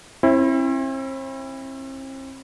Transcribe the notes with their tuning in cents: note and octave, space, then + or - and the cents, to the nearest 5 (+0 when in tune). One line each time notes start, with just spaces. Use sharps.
C4 +40 E4 +0